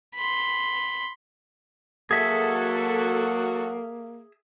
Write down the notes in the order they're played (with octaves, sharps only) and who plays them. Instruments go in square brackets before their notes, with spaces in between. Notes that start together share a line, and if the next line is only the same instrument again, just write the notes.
[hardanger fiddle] B5 C6
[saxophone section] F#3 F#4 [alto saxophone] A#3 [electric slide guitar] G#4 E5 [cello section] A4